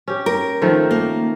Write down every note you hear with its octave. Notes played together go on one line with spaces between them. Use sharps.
C#4 G4
A#4
D#3 F3 A3
A#3